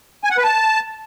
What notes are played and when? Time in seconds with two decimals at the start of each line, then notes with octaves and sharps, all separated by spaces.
0.24 G#5
0.31 F#5
0.37 B4
0.44 A5